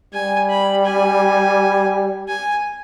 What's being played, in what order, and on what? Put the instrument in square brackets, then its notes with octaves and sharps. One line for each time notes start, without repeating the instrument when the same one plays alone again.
[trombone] G3 [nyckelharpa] G#5
[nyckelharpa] B5
G#5
G#5